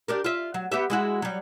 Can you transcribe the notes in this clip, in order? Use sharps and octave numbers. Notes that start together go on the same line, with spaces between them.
D4 G4 A#4
F4 E5
F#3
B3 G4 E5
G#3 E4 F#4
F#3 G3